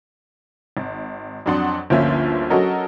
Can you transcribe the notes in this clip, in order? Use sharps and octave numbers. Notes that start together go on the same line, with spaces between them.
G#1
F2 F#3 D4 F#5 C6 D#6
G1 D2 F3 A#3 C#4 E5
F#3 C#4 F#4 A4 A#4 D#5